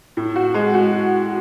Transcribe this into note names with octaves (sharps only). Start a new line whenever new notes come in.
A2
F#4
G#3
F#4